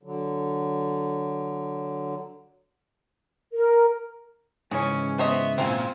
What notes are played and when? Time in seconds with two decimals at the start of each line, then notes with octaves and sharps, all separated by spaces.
0.03 D3 F#3
3.53 A#4
4.71 G#2 C#3 E3 C#4 G#4
5.19 B3 C5 C#5 D#5 E5
5.58 C#2 A#2 C4 F4 G#5